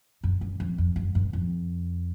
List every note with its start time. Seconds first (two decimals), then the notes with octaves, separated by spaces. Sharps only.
0.24 F#2
0.41 F#2
0.60 F2
0.78 F2
0.96 F#2
1.15 G2
1.33 F2